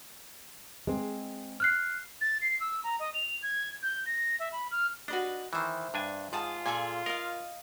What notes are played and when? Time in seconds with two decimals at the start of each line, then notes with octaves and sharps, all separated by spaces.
0.87 G#3 C4
1.60 F6 F#6 C7
2.21 A6
2.42 C7
2.60 E6
2.84 A#5
3.00 D#5
3.14 F7
3.43 G#6
3.83 G6
4.06 A#6
4.40 E5
4.52 B5
4.71 F6
5.08 D4 F#4 B4 D#5
5.53 D#3 E3 C5 E5
5.94 G2 D4 G#5
6.33 G#2 F4 G#4 A5 D#6
6.66 A#2 G#4 A4 G#5
7.06 A#4 D#5 F5